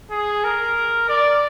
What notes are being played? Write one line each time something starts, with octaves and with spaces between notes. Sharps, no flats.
G#4
A#4
D5